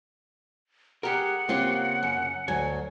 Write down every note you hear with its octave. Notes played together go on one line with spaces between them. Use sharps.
G#3 G4 A#4 F#5
C#3 A#3 C4 F4 G4
F#2
D2 F#3 G#5